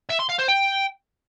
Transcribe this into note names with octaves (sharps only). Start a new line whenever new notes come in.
E5
C6
F5
C5
G5